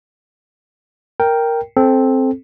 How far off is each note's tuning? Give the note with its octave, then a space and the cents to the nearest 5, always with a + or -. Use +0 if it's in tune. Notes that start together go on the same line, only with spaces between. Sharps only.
A#4 +0 G5 +0
C4 +5 A4 -15